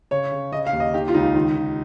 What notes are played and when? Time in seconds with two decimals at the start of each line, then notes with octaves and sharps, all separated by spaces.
0.11 C#3 C#5
0.32 C#3
0.52 C#3 D#5
0.67 F5
0.73 D#2
0.80 D#5
0.94 D#3 G4
1.08 F4
1.14 C#2 D#4
1.35 D#3
1.56 D#3